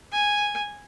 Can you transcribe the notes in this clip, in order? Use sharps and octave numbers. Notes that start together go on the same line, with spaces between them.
G#5